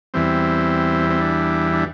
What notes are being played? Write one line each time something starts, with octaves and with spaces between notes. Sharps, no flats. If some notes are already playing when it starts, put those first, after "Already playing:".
E2 E3 G3 C4
C4
D4
D4